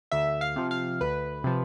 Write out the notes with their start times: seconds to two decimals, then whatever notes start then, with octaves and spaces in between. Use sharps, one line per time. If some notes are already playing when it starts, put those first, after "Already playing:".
0.12 D2 E5
0.41 F5
0.56 C3 F3
0.71 F5
1.01 D2 B4
1.44 C3 F3